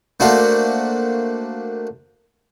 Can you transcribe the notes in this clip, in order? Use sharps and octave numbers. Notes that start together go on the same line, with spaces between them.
A3 A#3 D4 F#4 C5